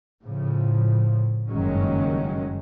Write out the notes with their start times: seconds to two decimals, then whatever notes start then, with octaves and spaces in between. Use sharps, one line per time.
0.22 A2 C#3 F3
1.49 F#1 G2 D#3 F#3 G#3 C#4